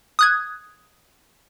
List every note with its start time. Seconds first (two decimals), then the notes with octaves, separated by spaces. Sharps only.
0.19 D#6 F#6 G#6